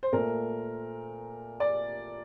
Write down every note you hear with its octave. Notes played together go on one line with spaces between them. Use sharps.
C5
A#2 A3 A#4
D5